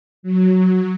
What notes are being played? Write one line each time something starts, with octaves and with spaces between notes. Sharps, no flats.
F#3